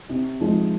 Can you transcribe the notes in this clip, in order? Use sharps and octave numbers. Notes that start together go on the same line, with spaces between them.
C3
F3 G#3 D#4